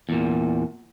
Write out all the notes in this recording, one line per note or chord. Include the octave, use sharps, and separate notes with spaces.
E2 A#2